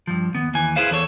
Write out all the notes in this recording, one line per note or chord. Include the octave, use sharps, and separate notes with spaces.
G2 F3
D#2 B3
D#2 E3 G#5
E4 G#4 B4 C5 F5
E2 A4 C#5